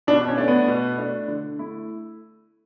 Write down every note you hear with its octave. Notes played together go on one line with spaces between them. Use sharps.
B2 D4
C#4
A3 D4
B3
B2
A3 D4
D3
A3 E4